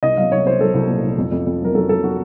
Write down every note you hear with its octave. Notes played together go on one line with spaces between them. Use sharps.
C2 D#5
F#3 F5
C2 C#5
C2 C5
F#3 A4
C2
A#2
C2
F2
F2
F2
F#3 A#4
F#3 A4
F#3 A4
F#4